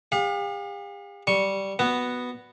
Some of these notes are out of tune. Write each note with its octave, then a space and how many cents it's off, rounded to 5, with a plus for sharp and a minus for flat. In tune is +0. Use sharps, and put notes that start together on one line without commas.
G4 +45 F5 +40
G3 -10 C#6 +0
B3 +0 F#4 +0